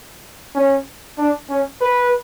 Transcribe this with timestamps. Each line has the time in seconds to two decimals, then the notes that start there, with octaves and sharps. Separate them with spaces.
0.55 C#4
1.18 D4
1.49 C#4
1.81 B4